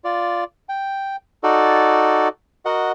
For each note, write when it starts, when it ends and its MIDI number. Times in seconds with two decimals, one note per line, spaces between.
0.04 0.44 65
0.04 0.44 74
0.69 1.16 79
1.43 2.28 63
1.43 2.28 66
1.43 2.28 69
1.43 2.28 74
2.65 2.92 66
2.65 2.92 70
2.65 2.92 75
2.65 2.92 78